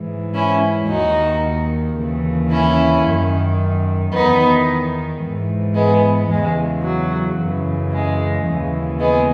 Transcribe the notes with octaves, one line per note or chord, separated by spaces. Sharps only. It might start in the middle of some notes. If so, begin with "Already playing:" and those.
Already playing: G#2 E3
C#4 E4
D#2 D#3 D#4 F#4
D#2 C#3 E3
C#4 E4
F#2 D#3
E2 D#3 B3 D#4
G#2 E3
G#3 B3
E2 C#3 E3 G#3
F#3
F#2 C#3 E3
G#3
D#2 C#3 E3
G#3 B3